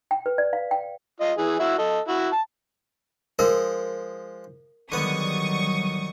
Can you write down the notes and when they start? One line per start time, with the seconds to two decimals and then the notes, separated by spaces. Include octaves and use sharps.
0.11 G5
0.26 B4
0.38 D5
0.53 F5
0.71 G5
1.21 F4 D#5
1.38 E3 G#4
1.60 E4 F#4 E5
1.78 A4 D#5
2.08 E4 F#4
2.32 A5
3.39 F3 G#3 A#4 D#5
4.92 D3 D#3 F#3 G3 B3 C#6 D#6